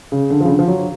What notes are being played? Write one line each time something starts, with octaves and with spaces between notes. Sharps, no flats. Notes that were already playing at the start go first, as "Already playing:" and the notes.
C#3
D3
F3
C#3
D3
F3
F#3